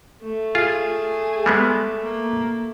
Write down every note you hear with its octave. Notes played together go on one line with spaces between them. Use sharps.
A3
F4 G#4
G3 G#3 B3
A#3